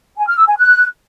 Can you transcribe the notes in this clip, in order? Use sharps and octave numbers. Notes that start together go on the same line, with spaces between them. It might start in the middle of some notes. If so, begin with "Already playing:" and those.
G#5
F6
E6
G#5
F#6